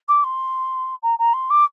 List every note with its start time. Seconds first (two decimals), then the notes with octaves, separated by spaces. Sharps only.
0.08 D6
0.24 C6
1.02 A#5
1.19 A#5
1.33 C6
1.50 D6